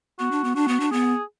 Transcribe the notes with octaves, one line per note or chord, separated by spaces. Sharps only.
B3 F#4
D4
B3
D4 F#4
B3
D4
B3 G#4